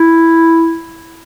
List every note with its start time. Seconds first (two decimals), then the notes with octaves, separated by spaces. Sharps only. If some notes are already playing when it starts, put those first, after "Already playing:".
Already playing: E4